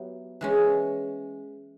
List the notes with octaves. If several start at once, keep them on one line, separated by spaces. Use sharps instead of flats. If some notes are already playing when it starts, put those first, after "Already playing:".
Already playing: F#3 B3 E4 G4
E3 G#3 C#4